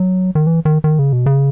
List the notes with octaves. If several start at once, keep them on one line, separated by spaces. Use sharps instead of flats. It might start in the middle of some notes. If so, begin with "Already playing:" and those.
Already playing: F#3
D#3
E3
D#3
D#3
C#3
B2
C#3